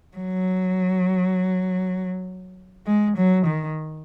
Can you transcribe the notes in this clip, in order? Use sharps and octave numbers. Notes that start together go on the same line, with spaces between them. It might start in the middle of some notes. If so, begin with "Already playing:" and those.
F#3
G#3
F#3
D#3